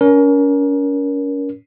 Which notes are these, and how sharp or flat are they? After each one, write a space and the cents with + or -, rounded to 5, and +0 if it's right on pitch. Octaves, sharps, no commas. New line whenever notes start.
C#4 +30 A#4 +20